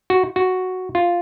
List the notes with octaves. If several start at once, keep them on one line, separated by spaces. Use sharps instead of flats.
F#4
F#4
F4